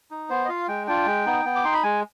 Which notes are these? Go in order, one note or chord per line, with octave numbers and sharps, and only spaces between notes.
D#4
B3 C5
D#5
F4 F5
G#3 G5
D4 F4 G5
G#3
B3 D#4
B3
D6
D#4 C6
B5
G#3 G#5